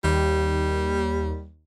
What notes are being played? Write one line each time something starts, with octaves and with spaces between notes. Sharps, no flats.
D#2 G3